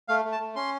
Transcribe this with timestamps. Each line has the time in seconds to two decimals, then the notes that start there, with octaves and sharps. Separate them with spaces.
0.08 A3 F5
0.25 A3
0.32 A5
0.40 A3
0.56 C#4 C6